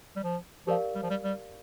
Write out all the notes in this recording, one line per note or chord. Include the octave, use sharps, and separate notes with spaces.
G3
F3
F3 G4 A#4 D5 F5
G3
F3
G3
G3